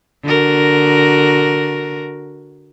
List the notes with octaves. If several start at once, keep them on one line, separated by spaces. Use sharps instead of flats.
D3 F#4 A#4